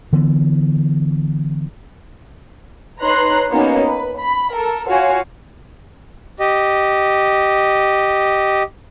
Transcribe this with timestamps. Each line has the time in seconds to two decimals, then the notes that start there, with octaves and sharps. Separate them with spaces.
0.13 D3 E3 B3
3.01 D#4 B4 C#5 A#5 C6 F#6
3.52 A#3 B3 C#4 D#4 F#4
3.85 B4
4.19 B5
4.53 A4 A#4
4.86 F4 F#4 C#5 F5 G#5
6.40 G4 D#5